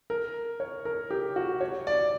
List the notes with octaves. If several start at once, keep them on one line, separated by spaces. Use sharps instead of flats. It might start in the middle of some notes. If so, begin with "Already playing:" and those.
A#4
C#5
A#4
G4
F#4
C#5
D5